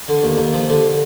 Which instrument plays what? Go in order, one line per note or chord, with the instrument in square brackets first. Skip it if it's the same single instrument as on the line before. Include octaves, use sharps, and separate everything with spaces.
[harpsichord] D3
D#2
D#2
F3
D3